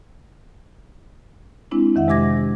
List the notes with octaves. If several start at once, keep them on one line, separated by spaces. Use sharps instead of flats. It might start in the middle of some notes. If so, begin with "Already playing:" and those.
G#3 C4 D4 E4
F2 D#3 E5 F#5
C3 G#3 G4 D6 G#6 A#6